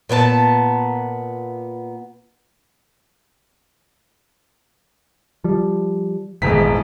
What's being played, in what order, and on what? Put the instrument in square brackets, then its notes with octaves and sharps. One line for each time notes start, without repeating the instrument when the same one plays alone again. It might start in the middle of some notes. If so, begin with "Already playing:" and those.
[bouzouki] A#2 B3 D#4 A5
[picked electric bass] F3 G3
[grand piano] D#1 E2 B6 [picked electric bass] G#1 G#2 G#3